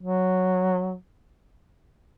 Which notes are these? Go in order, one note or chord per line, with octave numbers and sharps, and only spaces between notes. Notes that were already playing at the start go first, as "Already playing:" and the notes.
F#3